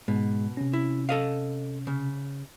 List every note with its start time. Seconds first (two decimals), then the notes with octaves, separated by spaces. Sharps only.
0.08 G#2 B2 G#3
0.57 C3 C#4
0.73 E4
1.09 A4 D#5 F5
1.87 C#3